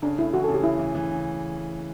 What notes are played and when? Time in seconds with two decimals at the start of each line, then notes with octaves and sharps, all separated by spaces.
0.02 C#3 D4
0.18 A3 E4
0.33 E3 F#4
0.44 A4
0.49 C#3
0.54 G4
0.64 C#3 E4
0.79 E3
0.95 E3
1.11 C#3